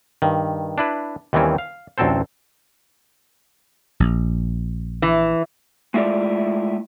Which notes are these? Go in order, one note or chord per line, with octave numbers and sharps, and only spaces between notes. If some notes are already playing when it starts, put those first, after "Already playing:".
G2 D#3
D4 E4 B4
D#2 D#3 E3 G3 C4 C#4
F5
A1 D2 F#3 C4 A4 C5
A#1
E3
G#3 A3 E4 F4 D5